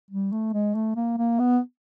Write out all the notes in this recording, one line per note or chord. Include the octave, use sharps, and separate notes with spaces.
G3
A3
G#3
A3
A#3
A#3
B3